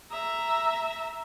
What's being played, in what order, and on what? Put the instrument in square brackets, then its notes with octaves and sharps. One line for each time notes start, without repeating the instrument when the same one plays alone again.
[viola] E5 A#5